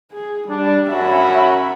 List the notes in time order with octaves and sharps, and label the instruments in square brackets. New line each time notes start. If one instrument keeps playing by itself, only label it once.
[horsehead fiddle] G#4
[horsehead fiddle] G3 [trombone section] D4
[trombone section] F#2 C#4 F#4 [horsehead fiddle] E5 B5